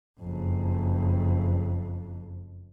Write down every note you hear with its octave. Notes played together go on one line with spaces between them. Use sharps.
F#1 F2